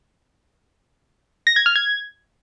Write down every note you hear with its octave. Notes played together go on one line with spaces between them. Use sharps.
A#6
G#6
F6
G#6